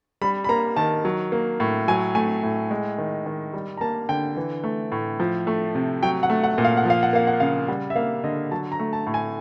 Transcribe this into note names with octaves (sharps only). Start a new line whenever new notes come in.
G3 B5
B5
A#3 A#5
D#3 A5
F#3
A#3
A2
F#3 G#5
A3 G#5
A2
G#3
D#3
D#3
G3
A#5
A#3 A5
D3 G5
E3
A3
A2
F3
A3
C3
F#3 G5
F#5
A3
F#5
A#2
F5
F#5
F3 F5
F#5
A#3 F5
F#5
C#3 F5
G3 F#5
E5
A#3 F5
D3 D#5
F#3 A5
A#5
A3
A5
A2
G#5